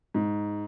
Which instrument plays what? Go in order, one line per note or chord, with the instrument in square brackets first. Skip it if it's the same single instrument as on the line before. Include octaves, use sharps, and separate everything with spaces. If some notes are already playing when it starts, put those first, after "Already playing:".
[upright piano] G#2